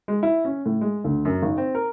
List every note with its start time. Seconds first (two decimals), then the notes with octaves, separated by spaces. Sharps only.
0.08 G#3
0.23 E4
0.45 C#4
0.66 A2
0.81 G#3
1.04 D2
1.25 F#2
1.43 G#1
1.58 C4
1.75 A#4